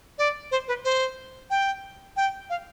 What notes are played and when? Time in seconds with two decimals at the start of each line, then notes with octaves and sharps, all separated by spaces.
0.18 D5
0.51 C5
0.68 B4
0.85 C5
1.50 G5
2.16 G5
2.50 F5